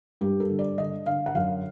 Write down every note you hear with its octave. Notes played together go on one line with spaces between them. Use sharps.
G2 G4
A4
D3
D5
D3 D#5
D3 F5
F#5
F#2 F5